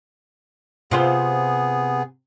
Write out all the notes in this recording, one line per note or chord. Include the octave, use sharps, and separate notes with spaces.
C3 B3 F4 G#4 C5